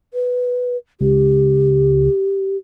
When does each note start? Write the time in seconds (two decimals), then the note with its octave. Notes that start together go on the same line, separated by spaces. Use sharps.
0.14 B4
1.01 C#2 G4